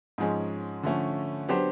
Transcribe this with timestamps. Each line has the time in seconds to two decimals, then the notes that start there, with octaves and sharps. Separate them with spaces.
0.18 G#2 F3 G#3 C#4
0.83 D3 F3 A3 C#4
1.49 F#3 B3 D4 G4 C5